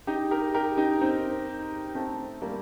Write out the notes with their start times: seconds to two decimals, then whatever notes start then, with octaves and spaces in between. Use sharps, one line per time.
0.07 D#4 G4
0.31 G4 A#4
0.54 G4 A#4
0.77 D#4 G4
1.01 C4 D#4
1.95 A3 C4
2.42 G3 A#3